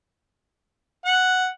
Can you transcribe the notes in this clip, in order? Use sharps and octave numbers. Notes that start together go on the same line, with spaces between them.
F#5